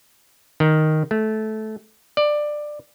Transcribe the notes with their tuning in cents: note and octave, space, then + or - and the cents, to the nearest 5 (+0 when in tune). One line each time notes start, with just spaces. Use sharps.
D#3 +0
A3 -15
D5 +15